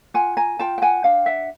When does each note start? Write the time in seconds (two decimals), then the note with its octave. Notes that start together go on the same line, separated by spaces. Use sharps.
0.14 F4 F#5 G#5
0.37 G#5 A#5
0.59 F4 G5 A5
0.78 G5
0.82 F#5 G#5
1.04 D4 F5 G5
1.26 E5 F#5